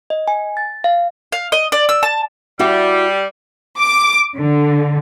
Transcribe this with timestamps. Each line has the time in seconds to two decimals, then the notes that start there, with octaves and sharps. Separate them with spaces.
0.10 D#5
0.28 G#5
0.57 A6
0.84 F5
1.32 F5
1.52 D#5
1.72 D5
1.89 E6
2.03 A5
2.59 G3 E4 F#4 E5
3.81 D6
4.37 D3